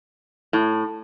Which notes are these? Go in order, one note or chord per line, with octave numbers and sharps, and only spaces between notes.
A2